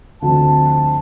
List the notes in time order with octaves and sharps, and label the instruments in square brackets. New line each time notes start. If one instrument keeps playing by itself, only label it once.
[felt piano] D2 D3 F3 C4 [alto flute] A5